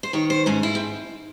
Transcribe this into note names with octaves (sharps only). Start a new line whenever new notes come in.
C5
D#3 C#5
C5
G#2 C#4
E4
C4